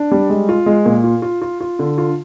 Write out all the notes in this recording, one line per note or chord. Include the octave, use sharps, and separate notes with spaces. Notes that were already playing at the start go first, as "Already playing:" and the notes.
Already playing: D4
G3
G#3
F4
G#3
A#2
F4
F4
F4
F4
D3
F4